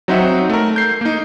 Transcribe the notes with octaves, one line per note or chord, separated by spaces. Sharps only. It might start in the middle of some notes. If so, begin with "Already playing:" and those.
F#3 C4 D#4 C5 E5 F#5
A3 A#4
G6 C7
A#3 D#4